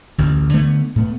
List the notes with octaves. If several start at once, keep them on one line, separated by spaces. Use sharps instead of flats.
A1 D2
D3 A3 B3
A2 A3 B3